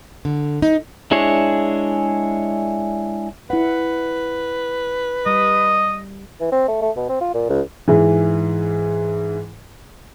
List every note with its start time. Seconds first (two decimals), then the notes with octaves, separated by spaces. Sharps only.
0.25 D3
0.62 D#4
1.11 G#3 D4 E4 G#4 C#5
3.50 E4 B4 F#5
5.26 G3 D#5
6.40 E3
6.52 C4
6.68 A3
6.82 A3
6.97 B2
7.09 C4
7.21 F4
7.34 A#2
7.49 C#2
7.88 G#2 E3